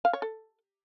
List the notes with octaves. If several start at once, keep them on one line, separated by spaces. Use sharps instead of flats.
F5
C#5
A4